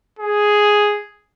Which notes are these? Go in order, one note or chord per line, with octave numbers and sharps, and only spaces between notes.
G#4